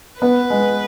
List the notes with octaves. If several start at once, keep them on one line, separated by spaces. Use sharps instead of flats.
B3 B4
G#3